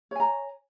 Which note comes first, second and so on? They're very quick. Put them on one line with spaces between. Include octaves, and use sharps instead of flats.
C#5 G#5 A#5